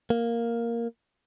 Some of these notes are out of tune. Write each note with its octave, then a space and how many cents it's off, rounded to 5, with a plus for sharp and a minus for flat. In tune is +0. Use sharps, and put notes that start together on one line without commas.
A#3 +0